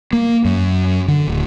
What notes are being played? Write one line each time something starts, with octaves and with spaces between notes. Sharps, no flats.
A#3
F#2
D3
D1